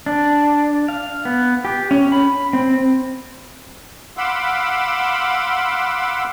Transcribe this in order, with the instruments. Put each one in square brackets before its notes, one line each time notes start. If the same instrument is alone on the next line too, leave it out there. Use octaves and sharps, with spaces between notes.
[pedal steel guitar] D4
F5
B3
G4
C#4
B5
C4
[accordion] F5 F#5 B5 C6 D6 E6